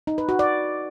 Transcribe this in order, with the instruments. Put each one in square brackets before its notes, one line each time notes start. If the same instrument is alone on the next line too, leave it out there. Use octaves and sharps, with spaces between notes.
[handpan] D#4
B4
F#4
D5